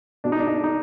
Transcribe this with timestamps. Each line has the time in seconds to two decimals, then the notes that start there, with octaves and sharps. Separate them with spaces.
0.24 B2 D4
0.32 D#4
0.40 D4
0.48 D#4
0.55 D4
0.64 D#4